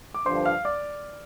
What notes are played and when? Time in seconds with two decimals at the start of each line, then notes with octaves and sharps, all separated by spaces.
0.14 D6
0.26 G2 D3 F3 D4 C5 C6
0.45 F5 F6
0.65 D5 D6